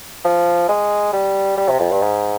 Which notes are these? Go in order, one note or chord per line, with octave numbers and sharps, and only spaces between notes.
F3
G#3
G3
G3
C3
F2
G2
G#2